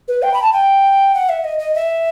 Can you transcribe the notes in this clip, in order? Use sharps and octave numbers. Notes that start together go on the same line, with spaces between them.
B4
G5
B5
A5
G5
F#5
E5
D#5
D#5
E5